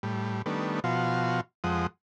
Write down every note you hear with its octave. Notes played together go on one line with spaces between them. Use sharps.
A2 G3
D#3 G3 A3 B3 D4
B2 F3 F#4 F5 C6
F2 F3 G#3 F#5 D#6